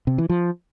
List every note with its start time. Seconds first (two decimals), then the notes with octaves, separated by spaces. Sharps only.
0.07 C3
0.18 E3
0.29 F3